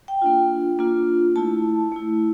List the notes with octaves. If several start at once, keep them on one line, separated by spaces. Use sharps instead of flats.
G5
A#3 D4 F4
A#3 D4 F4
A3 E4 A5
A3 E4